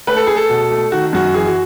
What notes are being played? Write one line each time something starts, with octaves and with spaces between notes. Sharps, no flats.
A3 B4
A4
A3 G#4
A4
B2
A3
D#3 F#4
F#2 F#4
E3 G#4
F#4